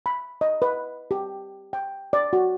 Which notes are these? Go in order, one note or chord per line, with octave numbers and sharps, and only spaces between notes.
B5
D#5
B4
G4
G5
D5
F#4